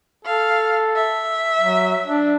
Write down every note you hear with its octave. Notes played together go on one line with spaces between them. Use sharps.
A4 F5
E5
F#3
D4